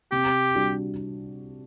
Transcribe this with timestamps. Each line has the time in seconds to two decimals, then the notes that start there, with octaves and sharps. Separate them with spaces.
0.12 C3 G4
0.55 G3 D4 F#4